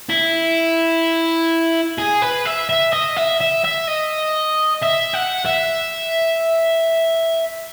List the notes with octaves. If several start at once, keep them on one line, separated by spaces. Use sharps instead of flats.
E4
G#4
B4
E5
E5
D#5
E5
E5
E5
D#5
E5
F#5
E5